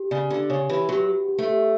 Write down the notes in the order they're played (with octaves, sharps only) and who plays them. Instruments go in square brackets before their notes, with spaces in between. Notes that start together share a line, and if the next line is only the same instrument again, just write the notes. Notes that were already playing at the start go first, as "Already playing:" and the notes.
Already playing: [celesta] G4
[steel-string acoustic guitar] C#3 [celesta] D5
[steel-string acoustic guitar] D3 [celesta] G4
[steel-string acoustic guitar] C#3 [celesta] C#5
[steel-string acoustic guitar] E3 [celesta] G4
[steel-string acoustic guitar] F#3 [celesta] G4
[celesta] G4
G4
[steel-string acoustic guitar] A3
[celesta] G4